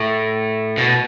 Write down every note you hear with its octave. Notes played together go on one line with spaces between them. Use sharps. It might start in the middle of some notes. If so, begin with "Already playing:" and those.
Already playing: A2
B2